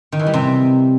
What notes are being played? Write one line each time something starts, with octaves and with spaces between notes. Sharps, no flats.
D#3
E3
G3
C3